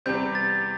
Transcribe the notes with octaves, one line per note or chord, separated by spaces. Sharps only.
E2 C3 G3 C4 G6
A6